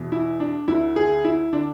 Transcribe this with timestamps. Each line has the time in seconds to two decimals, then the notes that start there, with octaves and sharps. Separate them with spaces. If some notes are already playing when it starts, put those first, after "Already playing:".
Already playing: E2 B2
0.12 E4
0.40 D4
0.68 D2 D3 E4
0.96 G#4
1.25 E4
1.53 D3 D4